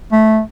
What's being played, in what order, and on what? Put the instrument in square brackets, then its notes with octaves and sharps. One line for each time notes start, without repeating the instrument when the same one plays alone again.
[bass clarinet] A3